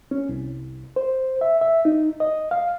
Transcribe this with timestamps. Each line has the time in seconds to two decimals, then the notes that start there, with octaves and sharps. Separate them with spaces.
0.11 C#4
0.29 C2
0.96 C5
1.41 E5
1.61 E5
1.85 D#4
2.20 D#5
2.51 F5